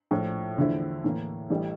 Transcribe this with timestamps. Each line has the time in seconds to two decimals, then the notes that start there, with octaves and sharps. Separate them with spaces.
0.11 A#1 A2 F3
0.57 E2 D3 F3 A3 E4
1.04 A2 E3 A#3
1.50 A1 A2 E3 G3